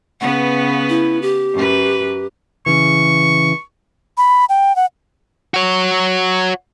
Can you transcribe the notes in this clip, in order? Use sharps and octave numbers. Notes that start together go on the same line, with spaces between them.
C#3 B3 B4 F#5
E4
G4
F#2 B4
C#3 E3 C#6
B5
G5
F#5
F#4 C#5